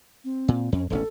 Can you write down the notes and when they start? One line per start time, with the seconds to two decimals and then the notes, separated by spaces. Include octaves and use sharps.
0.24 C4
0.48 A#2
0.72 F2 C#4
0.90 E1 A1 C#4 A4